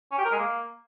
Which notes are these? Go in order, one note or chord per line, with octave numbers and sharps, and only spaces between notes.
C#4
G4
A#4
G#3
A#3